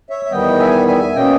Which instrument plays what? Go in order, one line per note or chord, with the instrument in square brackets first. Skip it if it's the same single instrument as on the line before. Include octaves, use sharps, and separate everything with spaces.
[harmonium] C#5 E5
E5
E2 D#3 G3 B3 D#5 G5
E5 G#5
E5 G#5
B2 A#3 C#4 D#5 G5